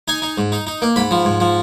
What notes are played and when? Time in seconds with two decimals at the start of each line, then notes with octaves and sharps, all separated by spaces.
0.08 D#4 G#5
0.22 D#4
0.38 G#2
0.52 D#4
0.67 D#4
0.82 A#3
0.96 G#2 B5
1.11 F3
1.25 G#2
1.40 F3